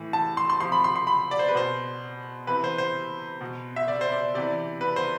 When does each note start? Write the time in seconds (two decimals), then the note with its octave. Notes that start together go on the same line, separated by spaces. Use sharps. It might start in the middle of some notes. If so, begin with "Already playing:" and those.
Already playing: A2 E3
0.13 A5
0.37 C6
0.50 C6
0.60 C3 F3 C6
0.72 B5
0.84 C6
0.95 C6
1.07 B5
1.31 D5
1.39 C5
1.48 B4
1.55 B2 C5
2.47 C3 E3 B4
2.64 C5
2.78 C5
3.41 B2
3.76 E5
3.88 D5
4.01 C5
4.12 D5
4.34 C3 E3 D5
4.81 B4
4.96 C5